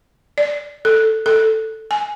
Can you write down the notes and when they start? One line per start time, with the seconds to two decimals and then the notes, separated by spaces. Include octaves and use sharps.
0.38 D5
0.85 A4
1.26 A4
1.91 G#5